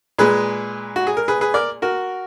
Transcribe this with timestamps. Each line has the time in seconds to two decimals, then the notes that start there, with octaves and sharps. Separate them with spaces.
0.19 A#2 G#3 G#4 B4
0.96 F#4
1.07 G#4
1.17 A#4
1.28 G#4 B4
1.41 G#4 B4
1.54 A#4 D5
1.82 F#4 A#4